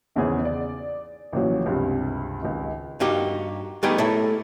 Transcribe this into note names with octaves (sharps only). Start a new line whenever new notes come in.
G#1 E2 C#3 B3 G#4 C5
D5
A1 A#2 C#3 F3 F#3
C#2 G2 C3
G#1 C#2
G2 A#3 D#4 F#4 G4
G3 A3 B3 D#4 G4 G#4
A3 A#3 E4 A4 C#5